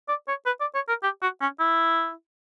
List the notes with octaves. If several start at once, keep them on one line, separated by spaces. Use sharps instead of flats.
D5
C#5
B4
D5
C#5
A#4
G4
F#4
C#4
E4